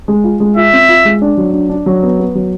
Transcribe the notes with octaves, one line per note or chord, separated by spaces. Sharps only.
G#3
F4
G#3
F4 E5
C4
F4
G#3
D4
F#3
D4
D4
F#3
B3
B3
F#3